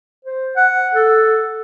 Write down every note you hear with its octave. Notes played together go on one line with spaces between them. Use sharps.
C5
F#5
A4